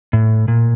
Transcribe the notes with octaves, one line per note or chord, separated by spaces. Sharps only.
A2
A#2